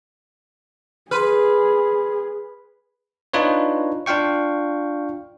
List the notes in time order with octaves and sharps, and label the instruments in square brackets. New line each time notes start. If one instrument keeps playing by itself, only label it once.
[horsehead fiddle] G#4 [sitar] B4 [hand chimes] B5 C6 F6
[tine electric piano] D4 D#4 F4 B4 C#5
D4 F4 F5 G5 C#6